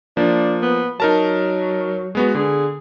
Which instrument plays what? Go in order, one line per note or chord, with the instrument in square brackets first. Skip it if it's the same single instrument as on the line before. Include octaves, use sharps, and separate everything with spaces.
[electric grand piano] F3 A#3 [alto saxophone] D4
[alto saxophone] B3
[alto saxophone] F#3 [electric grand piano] D#4 A#4 A5
[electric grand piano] G#3 B3 F#4
[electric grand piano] D3 [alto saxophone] G#4